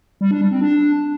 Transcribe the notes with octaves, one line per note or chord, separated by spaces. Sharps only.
G3
D4
G3
C4
D4